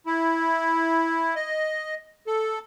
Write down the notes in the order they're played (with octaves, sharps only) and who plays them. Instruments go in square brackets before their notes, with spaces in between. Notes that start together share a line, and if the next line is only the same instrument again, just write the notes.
[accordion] E4
D#5
A4